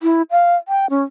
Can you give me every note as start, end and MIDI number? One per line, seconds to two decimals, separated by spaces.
0.03 0.22 64
0.31 0.56 77
0.68 0.89 79
0.90 1.03 61